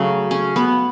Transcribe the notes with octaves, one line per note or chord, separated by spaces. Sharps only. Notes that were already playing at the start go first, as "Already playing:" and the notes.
Already playing: C#3 F#3 A3
C#4
B3